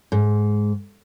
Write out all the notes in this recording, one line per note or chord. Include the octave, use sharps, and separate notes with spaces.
G#2